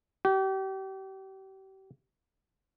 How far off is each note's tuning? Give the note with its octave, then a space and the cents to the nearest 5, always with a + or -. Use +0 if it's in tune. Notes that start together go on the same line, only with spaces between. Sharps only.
G4 -35